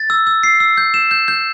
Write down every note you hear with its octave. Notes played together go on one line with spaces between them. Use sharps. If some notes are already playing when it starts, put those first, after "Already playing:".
Already playing: A6
E6
E6
C7
E6
G6
E7
G6
G6